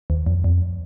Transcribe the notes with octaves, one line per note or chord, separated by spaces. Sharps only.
D#2
F2
F2